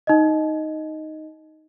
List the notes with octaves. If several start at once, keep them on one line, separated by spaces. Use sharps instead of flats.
D#4 D#5